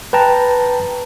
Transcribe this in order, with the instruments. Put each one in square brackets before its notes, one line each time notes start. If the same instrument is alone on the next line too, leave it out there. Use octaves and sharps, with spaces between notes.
[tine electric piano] B4 G5 A5 A#5